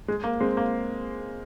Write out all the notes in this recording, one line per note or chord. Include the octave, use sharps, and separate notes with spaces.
G#3
A#3
G#3 C4
A#3